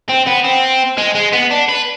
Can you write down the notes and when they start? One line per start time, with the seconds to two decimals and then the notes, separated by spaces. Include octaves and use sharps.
0.09 C4
0.27 B3
0.45 C4
0.98 G#3
1.15 G#3
1.33 B3
1.51 D4
1.69 B4